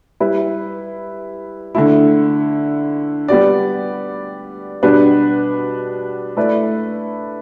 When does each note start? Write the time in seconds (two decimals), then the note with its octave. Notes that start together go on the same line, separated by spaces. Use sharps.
0.20 G3 E4 B4
1.75 D3 A3 E4
3.28 G3 B3 G4 D5
4.83 B2 G3 B3 D4 B4
6.37 A3 E4 B4 D5